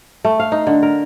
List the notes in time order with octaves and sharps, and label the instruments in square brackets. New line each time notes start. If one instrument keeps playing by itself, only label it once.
[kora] A3
F5
D#4
D3
A#4